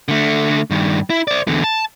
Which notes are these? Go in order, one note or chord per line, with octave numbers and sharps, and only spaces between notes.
D3 A3
G2 D#3
E4
C5 D5
E2 D3
A5